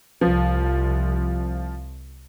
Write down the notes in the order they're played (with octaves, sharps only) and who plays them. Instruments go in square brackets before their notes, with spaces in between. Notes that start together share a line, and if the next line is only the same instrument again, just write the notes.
[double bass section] C2 [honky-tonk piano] F3